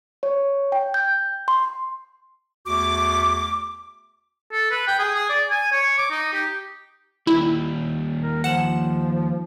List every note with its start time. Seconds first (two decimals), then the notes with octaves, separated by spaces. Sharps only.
0.23 C#5
0.72 G5
0.94 G6
1.48 C6
2.67 E2 A3 F#4 D6
4.52 A4
4.71 B4
4.87 G5
4.99 G#4
5.14 G#4
5.29 D5
5.50 G#5
5.72 C#5
5.98 D6
6.11 D#4
6.33 G4
7.27 D#2 G3 E4
8.22 A#4
8.44 F3 F#5 E7